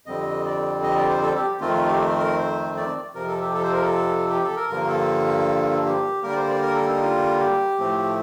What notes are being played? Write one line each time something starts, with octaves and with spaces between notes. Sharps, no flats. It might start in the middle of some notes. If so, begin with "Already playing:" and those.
F2 D3 G3 C4 D#5
D5
D#5
D5
C5
A4
G4
F2 D#3 A3 C4 F4
F4
G4
A#4
C5
D5
F2 C3 F3 A#4
A4
G4
A4
C5
A#4
A4
G4
A4
A#4
G2 D3 F3 A#3 A#4
A4
G4
D3 G3 A#3 A#4
D5
C5
D5
A#4
A4
D#4
F4
G4
A2 F3 A3 C4